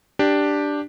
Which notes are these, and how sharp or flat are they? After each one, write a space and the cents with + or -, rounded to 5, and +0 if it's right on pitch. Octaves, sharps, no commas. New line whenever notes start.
D4 +0 G4 +0